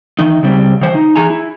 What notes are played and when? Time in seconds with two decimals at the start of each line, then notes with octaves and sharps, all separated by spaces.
0.19 D#3 E3 D#4
0.43 C#3 G3 C4
0.81 D#3 E3 C5
0.95 D#4
1.16 E3 G#4 G#5 A#5
1.30 E4